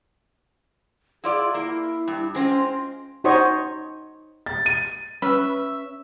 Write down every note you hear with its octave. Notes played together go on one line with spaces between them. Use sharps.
E4 F4 G#4 D5
A#3 E4
G2
G#3 C4 C#4 F4
D#4 F#4 C5 C#5 D#5 C#6
A6
D#7
C#4 B4 E5